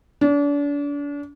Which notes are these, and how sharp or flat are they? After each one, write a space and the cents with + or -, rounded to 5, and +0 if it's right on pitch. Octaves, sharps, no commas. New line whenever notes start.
D4 -35